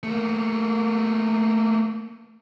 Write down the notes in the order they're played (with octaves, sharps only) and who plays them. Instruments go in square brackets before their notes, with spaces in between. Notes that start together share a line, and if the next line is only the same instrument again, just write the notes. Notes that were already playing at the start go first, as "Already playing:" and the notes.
[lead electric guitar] A3 A#3